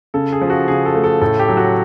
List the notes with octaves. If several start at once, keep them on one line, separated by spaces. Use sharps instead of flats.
C#3 A4
G#4
F3
F#4
C#3 G#4
A4
A3
A4
A2 A4
G4
F#3
F#4